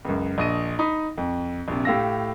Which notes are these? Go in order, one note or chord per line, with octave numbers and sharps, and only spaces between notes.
C#2 F#2
A#1 D#5 D#7
D#4 B5 D#6
F2
A#1 C3
A2 G4 F5 E6 A#6